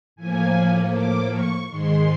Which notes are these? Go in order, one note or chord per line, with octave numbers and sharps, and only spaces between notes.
A2 F3 A#3 G#5
D6
C#6
G#2 D#3 G#3 C6